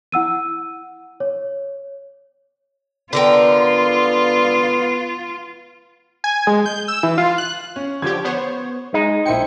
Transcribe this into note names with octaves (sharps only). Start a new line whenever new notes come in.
E4 F#5 E6 D#7
C#5
D3 B3 F4 A#4 G5
G#5
G#3
G6
E6
E3
F4
F#6
C#4
D3 F3 G4 G#6
B3 C5 C#5
G#3 D#4
A#1 E4 C5 G5 C#7